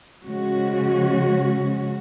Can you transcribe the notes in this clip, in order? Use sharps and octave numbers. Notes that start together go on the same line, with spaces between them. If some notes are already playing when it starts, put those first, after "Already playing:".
C#3 F3 G#3 C#4 F#4